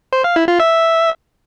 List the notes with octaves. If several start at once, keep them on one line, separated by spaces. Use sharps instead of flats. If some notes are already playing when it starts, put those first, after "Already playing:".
C5
F5
E4
F4
E5